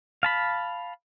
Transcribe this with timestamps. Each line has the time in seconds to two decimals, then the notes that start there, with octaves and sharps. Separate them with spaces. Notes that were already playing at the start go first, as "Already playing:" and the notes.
0.23 F5 A5 B5